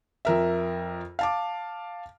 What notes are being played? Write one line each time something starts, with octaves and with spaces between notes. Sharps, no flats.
F2 A#4 E5
F5 A5 D6